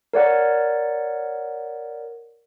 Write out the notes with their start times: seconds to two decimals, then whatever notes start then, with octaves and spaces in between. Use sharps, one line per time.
0.13 A#4 C#5 D5 F#5